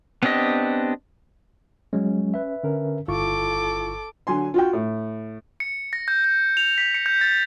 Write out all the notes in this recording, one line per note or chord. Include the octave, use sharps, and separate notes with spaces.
B3 C4 D4 G4 D#5
F#3 G#3 C#4
B4 E5
D3 C#4 A#4
G1 E4 F4 A4 C#6 D6
D3 F#3 G#5 C6
F4 F#4 G5
A2
C#7
A#6
G6
G6
F7
B6
C#7
G6
A6